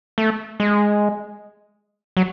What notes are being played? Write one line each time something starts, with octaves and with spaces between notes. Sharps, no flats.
A3
G#3
F#3